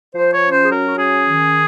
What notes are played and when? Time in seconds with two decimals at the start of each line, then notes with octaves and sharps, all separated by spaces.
0.15 F3 C5
0.32 C#5
0.42 C#4
0.51 C5
0.65 G#4
0.70 F#3 A#4
0.88 F#4
0.97 C#4 G#4
1.24 D#3